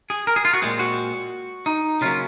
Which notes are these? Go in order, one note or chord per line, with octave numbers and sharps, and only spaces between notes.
G#4
A#4
G#4
F4
F#4
A#2 G#3 C4 G#4
F#4
D#4
C#3 F#3 A#3 C#4 F4